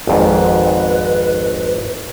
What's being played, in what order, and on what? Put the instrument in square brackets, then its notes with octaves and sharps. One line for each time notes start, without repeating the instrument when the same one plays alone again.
[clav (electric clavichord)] G#1 F2 G#2 [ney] B4